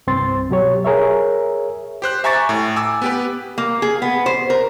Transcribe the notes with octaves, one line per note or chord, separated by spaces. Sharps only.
C2 G2 C4 C6 A6
B2 F#3 G4 C#5
G#4 A#4 C#5 E5
G4 C5 F#6
E5 G#5 A#5 C#6 D6 A6
A2
G#5 D6 E6
B3 G4 B4
A#3
G#4
B3
C5
A#4